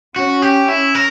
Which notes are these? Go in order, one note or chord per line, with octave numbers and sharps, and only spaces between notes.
C#4 F#4
G4
E4
A#4